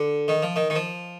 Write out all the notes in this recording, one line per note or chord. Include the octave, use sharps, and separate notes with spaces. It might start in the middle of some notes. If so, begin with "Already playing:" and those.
Already playing: D3
D#3
F3
D#3
D#3
F3